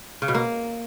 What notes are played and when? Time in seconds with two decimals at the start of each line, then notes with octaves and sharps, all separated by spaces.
0.22 C#3
0.28 B2
0.34 A#3